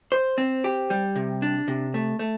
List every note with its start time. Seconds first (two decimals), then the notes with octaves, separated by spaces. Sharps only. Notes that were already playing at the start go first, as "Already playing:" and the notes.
0.12 C5
0.38 C4
0.64 G4
0.90 G3
1.16 C3
1.42 D4
1.68 C3
1.94 A3
2.19 A3